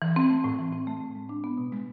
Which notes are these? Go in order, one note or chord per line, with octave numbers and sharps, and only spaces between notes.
E3
C4
A3
A2
E3
C4
A3
A2
G#3
D4
B3
B2
G#3